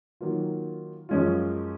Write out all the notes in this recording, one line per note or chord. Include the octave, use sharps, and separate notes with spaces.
D#3 F#3 A#3 F4
F#2 F3 G#3 C#4 F4